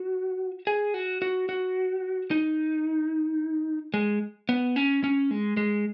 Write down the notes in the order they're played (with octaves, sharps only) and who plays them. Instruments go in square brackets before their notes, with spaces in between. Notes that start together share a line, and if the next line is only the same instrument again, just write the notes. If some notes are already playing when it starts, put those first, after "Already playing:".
Already playing: [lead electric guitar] F#4
G#4
F#4
F#4
F#4
D#4
G#3
B3
C#4
C#4
G#3
G#3